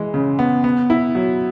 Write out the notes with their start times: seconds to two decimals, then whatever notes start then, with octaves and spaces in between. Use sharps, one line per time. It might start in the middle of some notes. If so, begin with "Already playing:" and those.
Already playing: E3 G#3
0.14 C#3
0.39 B3
0.64 B3
0.90 E4
1.15 F#3